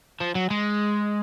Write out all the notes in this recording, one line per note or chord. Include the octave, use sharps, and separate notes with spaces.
F3
F#3
G#3